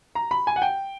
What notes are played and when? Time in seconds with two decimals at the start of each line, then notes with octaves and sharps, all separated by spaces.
0.15 A#5
0.31 B5
0.47 G#5
0.56 F#5
0.62 G5